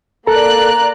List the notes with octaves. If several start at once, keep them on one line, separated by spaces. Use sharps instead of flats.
A#3 A4 D5 A#5 F#6